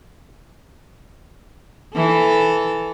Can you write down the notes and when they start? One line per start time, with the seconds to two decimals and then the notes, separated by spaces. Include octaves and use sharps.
1.95 E3 A4